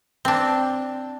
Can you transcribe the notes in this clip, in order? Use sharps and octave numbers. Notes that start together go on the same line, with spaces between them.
C4 D4